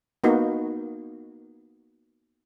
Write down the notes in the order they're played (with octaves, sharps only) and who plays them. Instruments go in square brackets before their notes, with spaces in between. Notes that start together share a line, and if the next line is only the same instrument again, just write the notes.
[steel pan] A#3 B3 D#4 F#4